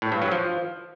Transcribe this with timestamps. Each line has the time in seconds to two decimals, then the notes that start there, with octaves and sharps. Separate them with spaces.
0.02 A2
0.12 G2
0.22 F#3
0.32 F3